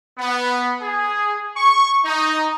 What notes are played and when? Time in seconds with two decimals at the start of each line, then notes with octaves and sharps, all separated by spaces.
0.18 B3
0.81 G#4
1.57 C#6
2.05 D#4